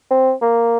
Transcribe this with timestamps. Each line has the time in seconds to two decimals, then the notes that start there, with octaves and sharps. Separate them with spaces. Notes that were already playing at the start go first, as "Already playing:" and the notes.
0.11 C4
0.42 A#3